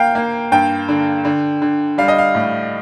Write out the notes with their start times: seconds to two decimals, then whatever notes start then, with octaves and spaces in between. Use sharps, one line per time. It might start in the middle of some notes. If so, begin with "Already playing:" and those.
Already playing: A#3 F5 G5
0.15 A#3
0.52 G2 G5
0.89 D3
1.25 D3
1.62 D3
1.98 G3 F5
2.08 D#5
2.18 F5
2.35 A2